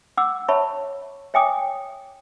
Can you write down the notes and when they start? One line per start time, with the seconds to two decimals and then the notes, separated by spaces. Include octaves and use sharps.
0.17 F#5 D6 E6
0.48 C#5 E5 A5 B5 C#6
1.34 C#5 E5 G5 G#5 D6 D#6